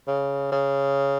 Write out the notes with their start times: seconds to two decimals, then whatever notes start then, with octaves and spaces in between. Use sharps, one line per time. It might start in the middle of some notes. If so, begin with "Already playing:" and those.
0.07 C#3
0.52 C#3